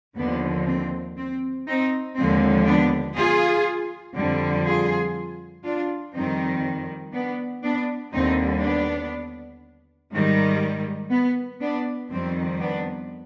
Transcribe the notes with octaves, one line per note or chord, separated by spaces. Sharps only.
D#2 D3 F3 B3 D4
C4
C4
C4 D#4
D#2 D3 F3 G#3 C4
B3 D4
F4 G#4
F2 D3 G3
F4 G#4
D4 F4
F2 D#3 G3 C4 D#4
B3 D4
B3 D4
D#2 D3 G3 C4 D#4
B3 D4
G#2 D#3 G3
B3
B3 D4
F2 D#3 G3 C4
B3 D4